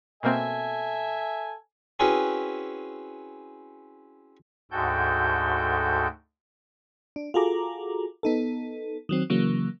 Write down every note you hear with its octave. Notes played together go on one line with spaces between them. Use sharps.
B2 A#3 C4 A4 E5 G#5
C4 C#4 E4 F#4 G#4 B4
D2 G#2 F#4 A4 G5 G6
D4
F4 F#4 G#4 A4 A#5 D6
B3 D#4 A4
D#3 F#3 C4
C#3 E3 F#3 A#3